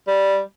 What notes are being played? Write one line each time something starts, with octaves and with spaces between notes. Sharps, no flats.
G3